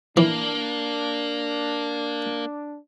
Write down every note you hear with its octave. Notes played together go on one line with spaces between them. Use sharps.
E3 A#3 D4